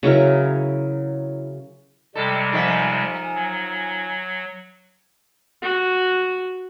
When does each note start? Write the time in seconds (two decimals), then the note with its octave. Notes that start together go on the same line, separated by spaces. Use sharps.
0.03 C#3 F#3 E4 A#4
2.15 C3 G3 G#3 A4 G5
2.52 D#3 F3 E5 G#5 A#5
3.35 F#3
5.62 F#4